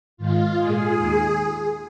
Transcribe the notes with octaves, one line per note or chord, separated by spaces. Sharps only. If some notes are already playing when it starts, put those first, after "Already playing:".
G#2 D#3 G#3 F4
A#2 G#3 G#4
D#2 D#3 A#3